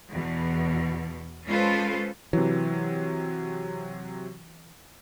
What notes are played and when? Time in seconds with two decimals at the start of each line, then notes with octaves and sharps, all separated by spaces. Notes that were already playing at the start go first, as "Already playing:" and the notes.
0.12 E2 B2
1.47 G#3 C#4 F4 A4 B4 C5
2.33 C3 E3 F#3